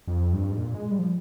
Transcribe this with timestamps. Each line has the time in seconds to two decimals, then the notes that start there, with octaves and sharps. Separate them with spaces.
0.07 F2
0.33 G2
0.51 G#2
0.57 A#2
0.75 G#3
0.91 G3
0.99 F3